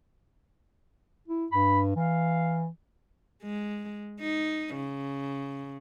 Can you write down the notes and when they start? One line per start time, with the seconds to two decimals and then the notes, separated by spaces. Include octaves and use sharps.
1.28 E4
1.52 G2 B5
1.96 E3 F5
3.43 G#3
4.20 D#4
4.75 C#3